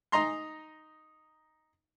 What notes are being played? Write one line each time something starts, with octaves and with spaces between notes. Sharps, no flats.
D#4 D#5 A#5 C6